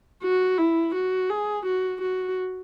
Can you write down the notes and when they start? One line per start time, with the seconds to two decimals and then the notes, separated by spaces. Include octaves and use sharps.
0.23 F#4
0.58 E4
0.95 F#4
1.30 G#4
1.65 F#4
2.01 F#4